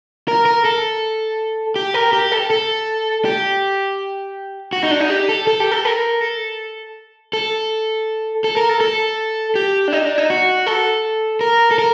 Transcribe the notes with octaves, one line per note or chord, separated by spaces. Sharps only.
A#4
A#4
A4
G4
A#4
G4
A4
A4
G4
F#4
D#4
D4
D#4
G4
A4
A4
G4
A4
A#4
A4
A4
A4
A#4
A4
A4
G4
D4
D#4
D4
D#4
F#4
A4
A#4
A4
A#4